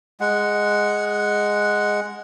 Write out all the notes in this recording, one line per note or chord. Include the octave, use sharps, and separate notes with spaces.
G#3 F#5